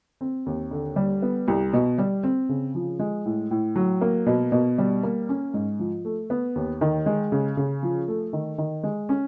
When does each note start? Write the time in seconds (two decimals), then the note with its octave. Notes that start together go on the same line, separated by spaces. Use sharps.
0.21 C4
0.46 D#2
0.71 D3
0.96 G3
1.22 B3
1.48 C2
1.73 B2
1.98 G3
2.23 C4
2.49 C#3
2.75 F3
2.99 G#3
3.26 A2
3.51 A2
3.76 F#3
4.01 A#3
4.26 B2
4.52 B2
4.78 G3
5.03 A#3
5.29 C#4
5.54 G#2
5.79 F3
6.05 A3
6.30 B3
6.55 D#2
6.81 D#3
7.06 G#3
7.32 C#3
7.57 C#3
7.83 F3
8.08 A3
8.33 D#3
8.58 D#3
8.83 G#3
9.09 C#4